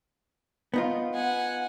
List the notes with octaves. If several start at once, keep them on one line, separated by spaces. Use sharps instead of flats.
B3 D#4 F4
F#5 G#5